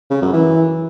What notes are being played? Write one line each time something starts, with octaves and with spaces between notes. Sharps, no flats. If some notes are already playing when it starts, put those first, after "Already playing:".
C#3
F#2
E3